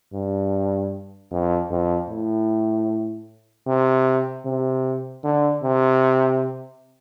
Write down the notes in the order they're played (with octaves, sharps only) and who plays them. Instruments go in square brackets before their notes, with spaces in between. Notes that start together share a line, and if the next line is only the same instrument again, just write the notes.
[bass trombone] G2
F2
F2
A2
C3
C3
D3
C3